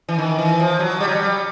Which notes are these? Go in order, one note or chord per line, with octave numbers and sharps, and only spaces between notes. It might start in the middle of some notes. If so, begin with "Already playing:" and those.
E3
D#3
E3
F3
F#3
G3
F#3
G3